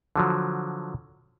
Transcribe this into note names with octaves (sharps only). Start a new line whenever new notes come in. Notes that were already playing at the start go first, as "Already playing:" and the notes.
D3 F3 F#3